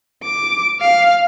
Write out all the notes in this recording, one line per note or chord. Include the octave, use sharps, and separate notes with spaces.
D6
F5